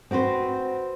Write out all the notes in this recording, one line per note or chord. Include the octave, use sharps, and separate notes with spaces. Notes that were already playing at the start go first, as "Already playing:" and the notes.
C4 F#4 B4 C5